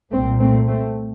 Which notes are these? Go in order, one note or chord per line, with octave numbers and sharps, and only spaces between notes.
C2 A#2 A3 C4
A3 C4
A3 C4